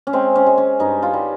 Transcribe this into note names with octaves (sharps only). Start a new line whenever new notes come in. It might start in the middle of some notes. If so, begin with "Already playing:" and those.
C#4
G#3 C4
C#4
G#3
C#4
G2 D#4
F4
G3